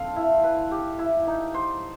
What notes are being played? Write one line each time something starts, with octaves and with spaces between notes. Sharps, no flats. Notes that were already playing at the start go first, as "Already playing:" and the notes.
Already playing: C4 A4 F5
E4
B4
G4
E4
D#4
C5